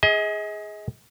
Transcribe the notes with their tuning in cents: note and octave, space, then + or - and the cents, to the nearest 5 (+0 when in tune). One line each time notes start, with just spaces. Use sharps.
G#4 +0 D#5 +35